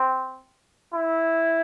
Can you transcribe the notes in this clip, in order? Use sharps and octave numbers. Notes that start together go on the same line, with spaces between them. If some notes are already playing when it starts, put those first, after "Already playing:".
Already playing: C4
E4